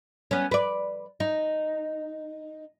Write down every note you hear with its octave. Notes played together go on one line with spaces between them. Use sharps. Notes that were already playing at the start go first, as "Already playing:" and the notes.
B3 C#4
B4 D5
D#4